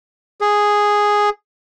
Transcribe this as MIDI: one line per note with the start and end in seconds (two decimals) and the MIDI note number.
0.41 1.30 68